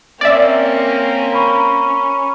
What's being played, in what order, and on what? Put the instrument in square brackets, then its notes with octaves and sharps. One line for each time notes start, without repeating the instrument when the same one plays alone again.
[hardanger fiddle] A#3 C4 [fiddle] C#4 [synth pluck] D5 E5
[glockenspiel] A#5 B5 C#6